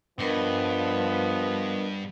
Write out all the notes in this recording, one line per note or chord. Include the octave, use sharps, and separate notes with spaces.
G2 F3 B3 D4 A#4 D#5